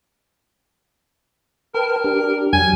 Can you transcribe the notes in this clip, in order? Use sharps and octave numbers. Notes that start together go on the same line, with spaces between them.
A#4 B4 G5 A5
D4 G4
F2 F#3 G#5